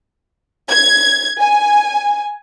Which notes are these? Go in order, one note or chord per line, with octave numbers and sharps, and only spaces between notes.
G#6
G#5